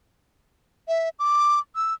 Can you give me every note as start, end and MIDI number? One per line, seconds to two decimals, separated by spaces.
0.88 1.09 76
1.19 1.60 86
1.76 1.94 88